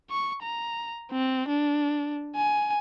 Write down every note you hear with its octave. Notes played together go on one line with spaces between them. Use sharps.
C#6
A#5
C4
D4
G#5